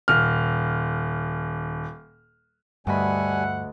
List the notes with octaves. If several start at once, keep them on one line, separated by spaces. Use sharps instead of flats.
D#1 F6
D2 G2 G3 D#5 E5 F#5 G#5 B5